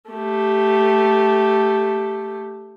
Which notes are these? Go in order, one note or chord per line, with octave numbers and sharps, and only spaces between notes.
A3 G4